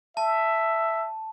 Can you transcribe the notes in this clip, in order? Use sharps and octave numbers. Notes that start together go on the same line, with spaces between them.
E5 A5